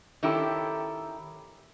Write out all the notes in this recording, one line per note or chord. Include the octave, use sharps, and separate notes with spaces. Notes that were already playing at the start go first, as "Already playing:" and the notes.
D#3 C#4 E4 G4 A4